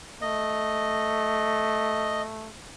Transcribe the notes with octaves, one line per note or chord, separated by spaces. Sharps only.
A3 D#5